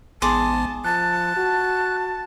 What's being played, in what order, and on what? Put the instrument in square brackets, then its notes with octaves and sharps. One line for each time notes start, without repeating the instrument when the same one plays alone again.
[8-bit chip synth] A1 B3 [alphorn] G#2 [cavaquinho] G#4 C6 D6 [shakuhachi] A5
[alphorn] F3 [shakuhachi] A5 [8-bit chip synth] F#6
[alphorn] F#4